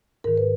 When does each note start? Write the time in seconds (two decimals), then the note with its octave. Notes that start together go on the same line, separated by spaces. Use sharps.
0.24 G#2 D#3 A#4
0.38 B4